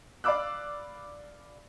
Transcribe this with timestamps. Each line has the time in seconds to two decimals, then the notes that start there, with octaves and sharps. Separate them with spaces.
0.24 D5 F5 B5 D6 E6 F#6